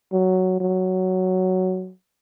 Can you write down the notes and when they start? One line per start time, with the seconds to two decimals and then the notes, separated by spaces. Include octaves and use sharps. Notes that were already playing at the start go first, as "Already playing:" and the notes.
0.12 F#3
0.60 F#3